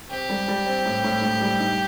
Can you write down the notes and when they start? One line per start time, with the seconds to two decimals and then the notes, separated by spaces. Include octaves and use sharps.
0.11 C4 G4
0.29 G3
0.48 G3
0.66 C4
0.85 A2
1.04 A2
1.22 A2
1.41 G3
1.60 D#4